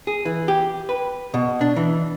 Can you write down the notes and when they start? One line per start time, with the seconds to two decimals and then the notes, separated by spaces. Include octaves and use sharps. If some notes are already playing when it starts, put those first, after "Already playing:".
0.07 G#4
0.25 E3
0.48 G4
0.89 B4
1.34 B2
1.61 D4
1.76 E3